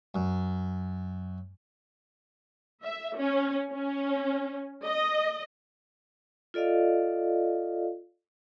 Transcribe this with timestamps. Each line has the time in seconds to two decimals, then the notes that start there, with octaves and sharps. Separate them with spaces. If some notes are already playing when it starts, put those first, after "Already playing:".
0.14 F#2
2.83 E5
3.16 C#4
3.73 C#4
4.86 D#5
6.54 F4 A4 D5 D#5 F5